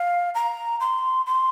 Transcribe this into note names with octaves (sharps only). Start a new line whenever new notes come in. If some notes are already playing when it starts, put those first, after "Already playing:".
Already playing: F5
A#5
C6
C6